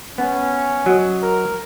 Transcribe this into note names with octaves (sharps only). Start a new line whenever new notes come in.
B3 C#4
F#3 D#5
A#4